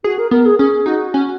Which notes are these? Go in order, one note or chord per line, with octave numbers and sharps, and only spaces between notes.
F#4 G#4
A#4
B3 A#4
G#4
C#4 G#4
D#4 F#4
C#4